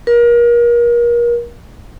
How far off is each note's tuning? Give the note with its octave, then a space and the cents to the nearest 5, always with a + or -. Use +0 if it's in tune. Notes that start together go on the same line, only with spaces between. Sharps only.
A#4 +35